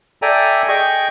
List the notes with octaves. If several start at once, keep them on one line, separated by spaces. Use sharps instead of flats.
A4 D5 E5 G5 G#5 A#5
G#4 D#5 G5 C#6